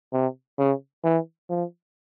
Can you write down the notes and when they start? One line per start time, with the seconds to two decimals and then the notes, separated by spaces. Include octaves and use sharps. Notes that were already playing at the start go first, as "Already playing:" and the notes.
0.13 C3
0.58 C#3
1.04 E3
1.50 F3